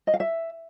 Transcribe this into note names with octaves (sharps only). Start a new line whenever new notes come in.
D#5
F5
E5